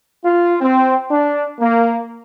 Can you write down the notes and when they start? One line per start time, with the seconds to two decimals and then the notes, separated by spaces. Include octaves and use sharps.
0.25 F4
0.61 C4
1.10 D4
1.60 A#3